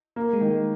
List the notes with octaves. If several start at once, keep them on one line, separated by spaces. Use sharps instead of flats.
A#3
G#3
D#3
G#3